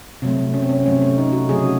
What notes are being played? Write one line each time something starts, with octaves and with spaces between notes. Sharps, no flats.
C3 F#3 A3
C#4
C4
C#4
C3 F#3 A3 C#4
C#4
D#4
F#4
C#3 F#3 A3 G#4